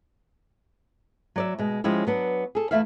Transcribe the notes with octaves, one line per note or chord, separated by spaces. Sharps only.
F#3 D5 E5
B2 G#3
F3 G#3 C#4 E4 G4
F#3 B3 D4
G#4 A4
E2 G#3 A3 E4 E5 F5